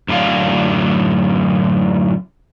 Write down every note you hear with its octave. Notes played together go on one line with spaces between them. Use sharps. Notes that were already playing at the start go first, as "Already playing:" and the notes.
F#2 A2 D3 F5